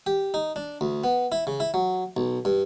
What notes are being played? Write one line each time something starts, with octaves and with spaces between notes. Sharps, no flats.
G4
D#4
D4
D2
B3
E4
C#3
E4
F#3
B1
G2